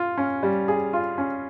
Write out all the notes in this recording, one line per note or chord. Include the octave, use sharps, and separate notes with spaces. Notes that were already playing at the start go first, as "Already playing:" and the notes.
Already playing: F4
C#4
G3
G#4
F4
C#4